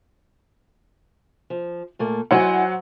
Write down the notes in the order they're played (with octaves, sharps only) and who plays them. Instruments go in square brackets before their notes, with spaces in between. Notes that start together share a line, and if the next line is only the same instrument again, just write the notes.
[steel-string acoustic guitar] F3
A#2 A3 A#3
[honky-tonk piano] F#3 C5 F#5 [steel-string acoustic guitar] E4 D#5 G#5